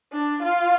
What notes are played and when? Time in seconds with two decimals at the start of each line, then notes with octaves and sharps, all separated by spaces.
0.12 D4
0.42 F4